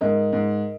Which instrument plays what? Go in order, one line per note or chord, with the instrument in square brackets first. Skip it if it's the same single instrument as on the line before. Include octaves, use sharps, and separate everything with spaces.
[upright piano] G#2 [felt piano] A#4 D#5
[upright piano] G#2